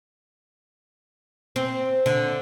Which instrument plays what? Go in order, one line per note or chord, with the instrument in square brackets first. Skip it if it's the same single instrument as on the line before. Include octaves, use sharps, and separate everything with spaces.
[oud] C4
D3